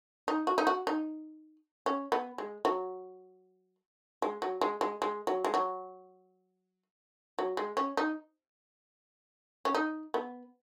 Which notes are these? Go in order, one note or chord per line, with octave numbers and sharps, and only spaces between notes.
D#4
F#4
D#4
F#4
D#4
C#4
B3
G#3
F#3
G#3
F#3
G#3
G#3
G#3
F#3
G#3
F#3
F#3
G#3
C#4
D#4
C#4
D#4
B3